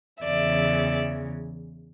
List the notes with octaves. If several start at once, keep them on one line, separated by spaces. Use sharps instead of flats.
E2 C#3 E3 D5 E5